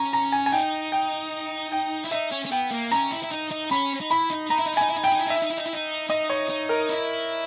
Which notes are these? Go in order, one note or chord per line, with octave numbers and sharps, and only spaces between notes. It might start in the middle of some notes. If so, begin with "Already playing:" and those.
Already playing: C#4 A#5
A#5
G#5
G#5
D#4 G5
G5
G5
E4
D#4 E5
C#4
C#4
B3 G5
A#3
C#4 A#5
E4
E4
D#4
D#4
C#4 B5
D#4
E4 B5
D#4
D#4 A#5
E4
D#4
E4
D#4 G#5
E4
D#4
E4 G5
D#4
E4
D#4
E4 E5
D#4
E4
D#4
E4
D#4
D#4 D#5
C#5
D#4
A#4
E4